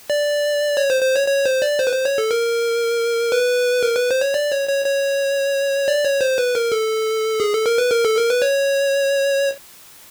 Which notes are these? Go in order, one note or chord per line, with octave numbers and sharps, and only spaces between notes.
D5
C#5
C5
C5
C#5
C#5
C5
D5
C5
B4
C5
C#5
A4
A#4
B4
A#4
B4
C5
C#5
D5
C#5
C#5
C#5
D5
C#5
C5
B4
A#4
A4
G#4
A4
A#4
B4
A#4
A4
A#4
B4
C#5